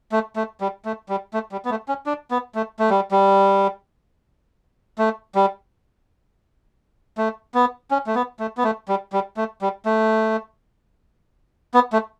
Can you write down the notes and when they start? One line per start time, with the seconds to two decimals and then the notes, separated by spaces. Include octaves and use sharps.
0.12 A3
0.36 A3
0.61 G3
0.85 A3
1.09 G3
1.33 A3
1.52 G3
1.65 B3
1.70 A3
1.88 C#4
2.06 D4
2.31 B3
2.55 A3
2.79 A3
2.90 G3
3.11 G3
4.98 A3
5.35 G3
7.18 A3
7.54 B3
7.91 C#4
8.07 A3
8.15 B3
8.39 A3
8.57 B3
8.64 A3
8.88 G3
9.12 G3
9.37 A3
9.61 G3
9.85 A3
11.74 B3
11.93 A3